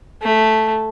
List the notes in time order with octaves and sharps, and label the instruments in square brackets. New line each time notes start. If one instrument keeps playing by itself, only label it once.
[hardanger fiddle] A3